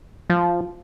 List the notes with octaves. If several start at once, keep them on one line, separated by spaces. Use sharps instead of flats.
F3